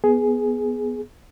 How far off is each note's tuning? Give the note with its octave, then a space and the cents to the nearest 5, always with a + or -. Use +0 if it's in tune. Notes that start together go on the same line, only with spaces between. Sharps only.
B3 +0 G#4 +10